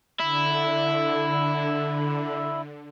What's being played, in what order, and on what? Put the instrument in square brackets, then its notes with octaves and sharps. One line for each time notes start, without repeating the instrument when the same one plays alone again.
[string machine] D3 [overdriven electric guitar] E4